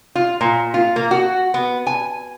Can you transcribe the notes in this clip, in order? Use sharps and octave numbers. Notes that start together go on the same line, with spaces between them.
F4
A#2
F4
A#3
F#4
B3
G#5